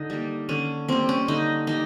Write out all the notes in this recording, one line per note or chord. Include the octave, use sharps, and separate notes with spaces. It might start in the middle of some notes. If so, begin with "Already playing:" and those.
Already playing: D3 D#4
G3 A#3
D3 C#4
G3 A#3 C4
C#4
D3 D#4
G3 A#3 D#4